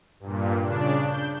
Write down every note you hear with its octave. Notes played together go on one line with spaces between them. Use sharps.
G2 A#2
C#3 D4
G6